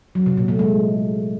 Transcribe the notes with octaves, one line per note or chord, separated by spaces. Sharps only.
F#3
C3
A#2
A3
G#3